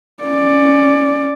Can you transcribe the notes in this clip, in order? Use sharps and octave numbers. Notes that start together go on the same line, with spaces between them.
C#4 D5